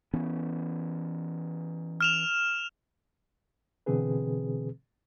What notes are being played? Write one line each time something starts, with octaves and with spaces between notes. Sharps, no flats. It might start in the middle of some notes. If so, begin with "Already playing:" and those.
E3 B3 C#4
F6 E7 F7
B2 D3 E3 C4 G#4 B4